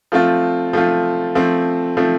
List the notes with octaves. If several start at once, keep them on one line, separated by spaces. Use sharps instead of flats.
F3 A3 C4 F4
F3 A3 C4 F4
F3 A3 C4
F3 A3 C4